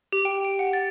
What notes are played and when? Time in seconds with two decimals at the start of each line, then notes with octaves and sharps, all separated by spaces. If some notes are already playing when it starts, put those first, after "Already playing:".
0.13 G4
0.25 G5
0.45 D7
0.59 F#5
0.73 A6